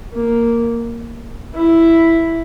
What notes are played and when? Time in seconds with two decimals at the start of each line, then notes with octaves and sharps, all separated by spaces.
0.13 A#3
1.54 E4